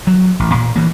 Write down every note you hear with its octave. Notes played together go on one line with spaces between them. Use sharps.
F#3
A1
A#2
E3 A#3